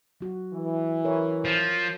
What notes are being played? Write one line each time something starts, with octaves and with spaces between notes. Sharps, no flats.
F#3 F#4
E3
A#4 C#5
F3